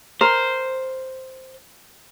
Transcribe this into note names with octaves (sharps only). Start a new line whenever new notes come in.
A#4 C5